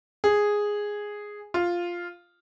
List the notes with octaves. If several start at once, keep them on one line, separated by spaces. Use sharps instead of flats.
G#4
F4